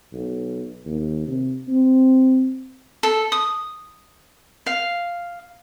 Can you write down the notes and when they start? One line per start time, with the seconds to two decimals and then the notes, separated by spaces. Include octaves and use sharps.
0.13 B1
0.86 D#2
1.27 C3
1.68 C4
3.03 A4
3.32 D#6
4.66 F5